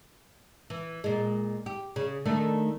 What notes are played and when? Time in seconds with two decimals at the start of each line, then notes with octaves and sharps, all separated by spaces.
0.70 E3
1.04 A#2 G#3
1.66 G4
1.96 C#3
2.26 D#3 A3 D4